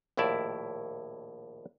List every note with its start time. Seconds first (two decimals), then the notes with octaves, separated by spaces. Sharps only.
0.17 A#1 D#2 A2 E4 D5 E5